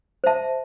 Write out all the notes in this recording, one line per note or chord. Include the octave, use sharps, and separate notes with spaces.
C5 E5 A5